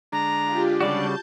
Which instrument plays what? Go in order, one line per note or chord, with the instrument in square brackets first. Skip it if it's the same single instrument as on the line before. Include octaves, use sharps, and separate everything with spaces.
[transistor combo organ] D3 G#3 D4 [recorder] A#5
[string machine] F4 G4
[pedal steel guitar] C#3 G3 F#4 [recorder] D5 [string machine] A5 G6